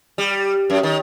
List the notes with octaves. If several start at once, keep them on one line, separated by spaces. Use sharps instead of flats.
G3
F#2
D#3